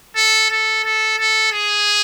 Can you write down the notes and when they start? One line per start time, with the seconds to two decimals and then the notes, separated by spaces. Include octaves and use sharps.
0.16 A4
0.50 A4
0.84 A4
1.18 A4
1.52 G#4